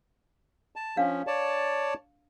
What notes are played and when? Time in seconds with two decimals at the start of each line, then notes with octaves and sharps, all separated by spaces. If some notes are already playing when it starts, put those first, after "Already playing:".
0.76 A5
0.97 F3 C#4 D4 F5
1.27 C#5 D5 A5